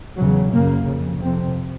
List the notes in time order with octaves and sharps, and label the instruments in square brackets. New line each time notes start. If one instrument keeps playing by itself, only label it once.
[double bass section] E2 C#3 F#3
F#2 C#3 A#3
F2 C#3
F2 C3 C4